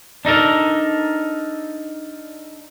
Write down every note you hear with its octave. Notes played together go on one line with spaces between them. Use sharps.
D4 D#4 A4 A#4